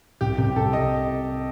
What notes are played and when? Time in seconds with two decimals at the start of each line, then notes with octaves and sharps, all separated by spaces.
0.21 C2 G4
0.38 C2 G4
0.56 C2 A4
0.73 D#5